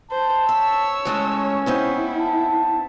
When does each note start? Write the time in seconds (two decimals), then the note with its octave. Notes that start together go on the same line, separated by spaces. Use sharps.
0.11 C5 A5
0.49 C#5 E5 E6
1.05 E3 G#3 A3 C#4
1.66 B3 C4 D#4 E4
2.19 A5